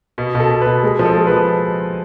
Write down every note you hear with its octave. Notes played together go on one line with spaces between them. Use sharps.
B2
B2
A4
B2
B2 B4
G#3
F3
A4
G#3
F3 B4